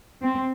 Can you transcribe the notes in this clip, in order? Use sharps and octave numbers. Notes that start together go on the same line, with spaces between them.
C4